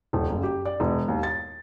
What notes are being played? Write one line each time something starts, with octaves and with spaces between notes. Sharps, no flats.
D#1
F#1
G4
D5
E1
D#2
A6